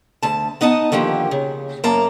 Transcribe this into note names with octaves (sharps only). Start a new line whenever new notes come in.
D2 A5
B3 D#4 D#5 F#5 A5
D3 D#3 F3 A#3 G4
C#3
F#2 A#3 A5 A#5